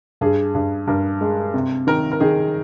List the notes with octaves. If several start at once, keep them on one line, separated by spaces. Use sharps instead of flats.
G2 G#4
G2
G2 A#4
G#3
C3
D#3 A#4
A#4
D#3 G#4